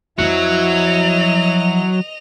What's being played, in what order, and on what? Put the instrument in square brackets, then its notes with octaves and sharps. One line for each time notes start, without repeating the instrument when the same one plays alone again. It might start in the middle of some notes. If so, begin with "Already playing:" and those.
[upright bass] F2 F3 [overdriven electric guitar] F#3 [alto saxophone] E4 [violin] D#5 F7